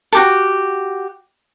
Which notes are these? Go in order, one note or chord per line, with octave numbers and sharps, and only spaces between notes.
F#4 G4 A4